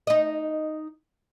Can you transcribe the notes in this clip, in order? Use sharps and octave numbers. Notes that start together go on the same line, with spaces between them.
D#4 D#5